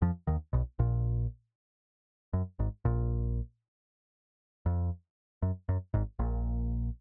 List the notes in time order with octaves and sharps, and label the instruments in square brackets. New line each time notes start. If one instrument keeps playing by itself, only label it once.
[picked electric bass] F2 F3
D#2 D#3
B1 B2
A#1 A#2
F#2
G#1 G#2
A#1 A#2
F2
F#2
F#2
G#1 G#2
A#1 A#2